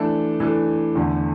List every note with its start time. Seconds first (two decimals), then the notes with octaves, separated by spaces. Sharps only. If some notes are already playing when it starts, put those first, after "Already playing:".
Already playing: E3 A3 D4 A4
0.40 E3 A3 D4 A4
0.95 E2 D3 A3